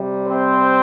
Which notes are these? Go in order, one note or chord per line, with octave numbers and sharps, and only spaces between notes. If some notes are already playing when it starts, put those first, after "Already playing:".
Already playing: C3 G3
C4 C5